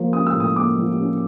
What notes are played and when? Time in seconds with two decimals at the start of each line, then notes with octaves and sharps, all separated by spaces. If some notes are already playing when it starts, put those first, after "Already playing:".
Already playing: F3 A#3
0.13 C#4 D#6
0.27 E6
0.35 A2
0.40 D#6
0.56 A#3 D6
0.78 F3
1.00 C#4